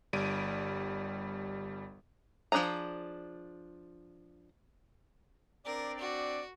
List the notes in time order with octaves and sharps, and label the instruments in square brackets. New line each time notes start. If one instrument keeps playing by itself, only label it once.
[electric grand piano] G1 G3 D7 D#7
[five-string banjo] F3 C4 D4 G#4 A#5
[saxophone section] C4 D4 D5 [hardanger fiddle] A#4
[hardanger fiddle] F#4